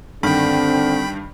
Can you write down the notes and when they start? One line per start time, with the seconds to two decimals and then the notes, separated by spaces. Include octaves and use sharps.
0.23 G2 D3 D#3 C4 G5 B5